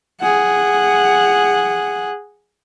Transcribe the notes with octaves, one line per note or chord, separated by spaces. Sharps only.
G#4 F#5